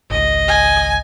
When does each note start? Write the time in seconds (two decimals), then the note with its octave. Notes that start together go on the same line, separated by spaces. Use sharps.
0.10 G#1 C#2 D#5
0.48 G#5